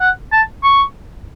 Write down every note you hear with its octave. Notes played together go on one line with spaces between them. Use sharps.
F#5
A5
C#6